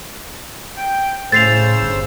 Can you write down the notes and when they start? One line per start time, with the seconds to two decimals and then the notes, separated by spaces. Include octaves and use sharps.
0.77 G5
1.32 A2 C#3 C5 E6 A6 C7 F7
1.82 G1